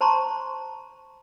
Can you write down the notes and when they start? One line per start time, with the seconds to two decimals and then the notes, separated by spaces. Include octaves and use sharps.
0.01 C5 A5 A#5 C6 C#6